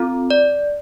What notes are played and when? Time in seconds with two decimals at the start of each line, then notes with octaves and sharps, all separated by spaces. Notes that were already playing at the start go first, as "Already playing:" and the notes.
Already playing: C4 F4 A4
0.30 D5